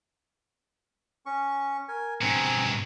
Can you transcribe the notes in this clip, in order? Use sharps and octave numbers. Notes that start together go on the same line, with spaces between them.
C#4 C#6
A#4 G#5
G2 B2 C4 G#5 A#5